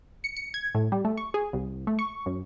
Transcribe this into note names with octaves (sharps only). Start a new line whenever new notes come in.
C#7
C#7
G#6
A2
G3
A3
C#6
G#4
C2
A3
C#6
F#2